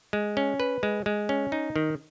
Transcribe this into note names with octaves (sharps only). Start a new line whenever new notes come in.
G#3
C#4
B4
G#3
G#3
C#4
D#4
D#3